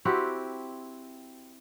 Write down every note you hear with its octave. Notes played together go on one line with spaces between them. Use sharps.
C4 E4 F#4 G4